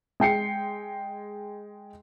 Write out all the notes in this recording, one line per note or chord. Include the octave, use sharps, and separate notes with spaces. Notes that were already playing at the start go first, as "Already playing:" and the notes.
G#3 G5 C7 C#7